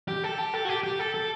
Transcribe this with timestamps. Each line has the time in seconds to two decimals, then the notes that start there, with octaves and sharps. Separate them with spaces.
0.08 G4
0.23 A4
0.38 G4
0.54 A4
0.65 F#4
0.69 G4
0.84 G4
0.99 A4
1.14 A4